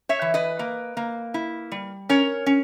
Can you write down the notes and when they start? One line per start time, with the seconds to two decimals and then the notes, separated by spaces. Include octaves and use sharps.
0.09 C#5 E5
0.22 E3
0.34 B4 D#5
0.59 A#3
0.97 A#3
1.34 E4
1.72 G3
2.09 C#4 A#4 C#5
2.46 C#4